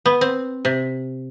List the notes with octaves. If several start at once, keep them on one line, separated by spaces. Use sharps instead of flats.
B3
C4
C3